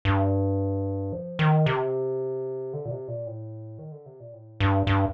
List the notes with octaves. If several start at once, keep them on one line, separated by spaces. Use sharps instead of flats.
G2
F3
D#3
C3
D3
A#2
C3
A#2
A2
D#3
D3
C3
A#2
A2
G2
G2